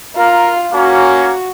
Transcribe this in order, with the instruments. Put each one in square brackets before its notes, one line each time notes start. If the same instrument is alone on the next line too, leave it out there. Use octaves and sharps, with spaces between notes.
[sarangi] F4 [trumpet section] A#4
[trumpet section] A#3 C#4 [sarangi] F#4